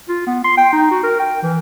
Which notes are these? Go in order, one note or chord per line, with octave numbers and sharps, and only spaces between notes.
F4
B3
C6
G5
D#4
F#4
A#4
G5
E3